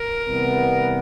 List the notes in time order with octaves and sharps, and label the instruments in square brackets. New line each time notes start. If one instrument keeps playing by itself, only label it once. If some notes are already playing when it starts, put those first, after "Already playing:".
Already playing: [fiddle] A#4
[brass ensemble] C3 E3 G3 B3